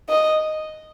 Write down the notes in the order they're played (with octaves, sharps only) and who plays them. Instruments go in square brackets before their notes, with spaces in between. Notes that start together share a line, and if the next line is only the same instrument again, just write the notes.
[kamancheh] D#5